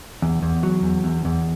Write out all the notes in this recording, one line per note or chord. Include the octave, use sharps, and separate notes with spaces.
E2
E2
F#3
E2
E2
E2